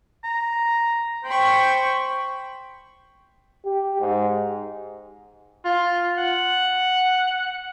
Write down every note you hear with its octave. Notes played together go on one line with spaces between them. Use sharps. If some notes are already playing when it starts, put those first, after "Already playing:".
A#5
C5 G5 B5 C#6
G4
G#2
F4
F#5